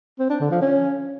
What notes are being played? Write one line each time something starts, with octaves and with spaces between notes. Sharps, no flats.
C4
D4
D3
F3
C#4